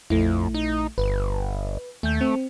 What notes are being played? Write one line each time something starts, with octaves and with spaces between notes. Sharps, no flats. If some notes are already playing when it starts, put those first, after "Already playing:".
A#1 F2 A3 E4
D#4
G1 B4
D#2 A3 G6
C4